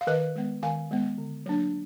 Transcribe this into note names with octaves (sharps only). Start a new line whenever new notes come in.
F5
D#3 B4 D#5
G#3 B3
D#3 F5 G#5
G#3 B3
D3
F#3 A#3 D4